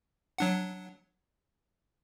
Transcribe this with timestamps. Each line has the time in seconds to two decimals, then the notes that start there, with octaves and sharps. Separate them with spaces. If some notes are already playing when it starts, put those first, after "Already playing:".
0.38 F#3 D4 F#5